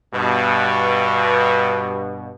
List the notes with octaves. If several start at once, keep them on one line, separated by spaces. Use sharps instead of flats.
G2 B2